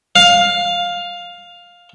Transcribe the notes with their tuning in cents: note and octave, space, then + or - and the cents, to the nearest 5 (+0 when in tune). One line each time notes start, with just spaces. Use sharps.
F5 +10